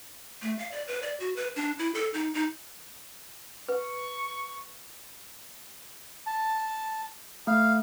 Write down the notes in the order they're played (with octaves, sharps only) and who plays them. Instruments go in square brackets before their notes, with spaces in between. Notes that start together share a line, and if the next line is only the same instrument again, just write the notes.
[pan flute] A3
F5
D5
B4
D5
F#4
B4
D4
E4
A4
D#4
D#4
[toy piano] B4 [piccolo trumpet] C#6
[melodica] A5
[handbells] A3 [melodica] F5